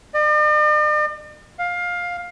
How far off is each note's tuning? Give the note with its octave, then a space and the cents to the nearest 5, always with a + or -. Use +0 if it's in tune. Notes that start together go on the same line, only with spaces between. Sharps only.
D5 +45
F5 +15